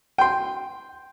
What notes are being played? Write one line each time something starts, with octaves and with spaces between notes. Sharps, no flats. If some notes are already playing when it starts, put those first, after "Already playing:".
G5 C6